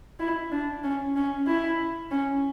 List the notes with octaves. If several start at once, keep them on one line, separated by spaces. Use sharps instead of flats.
E4
D4
C#4
C#4
E4
C#4